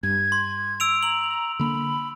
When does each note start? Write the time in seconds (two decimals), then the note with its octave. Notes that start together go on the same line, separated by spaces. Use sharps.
0.03 G2 G#6
0.32 C6
0.80 E6 D7 F7
1.03 A#5 F#7
1.59 D3 A#3 B5